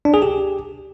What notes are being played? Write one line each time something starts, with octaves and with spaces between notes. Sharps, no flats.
D4
G#4
G4